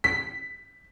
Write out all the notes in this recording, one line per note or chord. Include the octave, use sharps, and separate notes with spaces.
B6